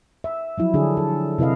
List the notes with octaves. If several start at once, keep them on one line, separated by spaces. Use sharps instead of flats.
E5
F3 F#3 E4
D3 D4 G#4
A4
C3 E4 B4 D#5 F5